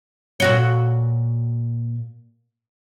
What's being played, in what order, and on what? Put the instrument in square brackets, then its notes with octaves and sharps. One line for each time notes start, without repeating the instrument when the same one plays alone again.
[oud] A#2 F#4 C#5